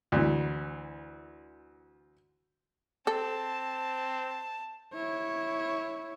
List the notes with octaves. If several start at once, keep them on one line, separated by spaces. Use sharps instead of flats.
D2 E3
C4 A4 A5
E4 C#5